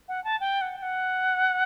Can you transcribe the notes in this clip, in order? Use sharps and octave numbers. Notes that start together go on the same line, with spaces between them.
F#5
A5
G5
F#5
G5
F#5